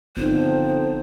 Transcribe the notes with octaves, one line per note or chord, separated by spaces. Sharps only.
G1 D3 F3 B3 C4 D#4 C5